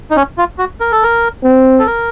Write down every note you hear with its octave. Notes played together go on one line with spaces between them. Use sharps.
D#4
C#4
F4
F#4
A#4
A4
A#4
C4
A4
A#4